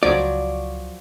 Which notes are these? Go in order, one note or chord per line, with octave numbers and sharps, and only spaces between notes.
C#2 F3 F#3 C#5 D5 C#6